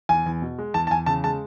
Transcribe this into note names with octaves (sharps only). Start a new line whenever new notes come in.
E2 G#5
E2
B2
G#3
E2 A5
A5
E2 G#5
C#3 A5
G#3 A5